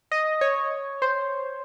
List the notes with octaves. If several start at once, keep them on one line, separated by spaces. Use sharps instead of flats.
D#5
C#5
C5